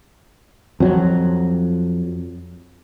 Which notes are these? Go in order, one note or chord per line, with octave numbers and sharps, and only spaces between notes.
F2 F#3